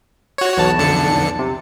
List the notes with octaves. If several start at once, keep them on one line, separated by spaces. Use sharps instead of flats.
F#4 C#5
B1 E2 A5
F2 D3 C#7
C3